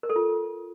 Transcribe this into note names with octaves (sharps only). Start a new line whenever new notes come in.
A#4
A4
F4